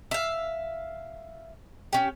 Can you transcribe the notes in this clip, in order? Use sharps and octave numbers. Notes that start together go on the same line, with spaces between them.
E5 F5
C#4 G4